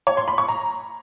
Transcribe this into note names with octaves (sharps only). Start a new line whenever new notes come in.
C#5
C6
B5
C#6
A#5